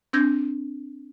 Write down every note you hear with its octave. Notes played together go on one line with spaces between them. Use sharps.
C4 D4 E6 G6 G#6 A#6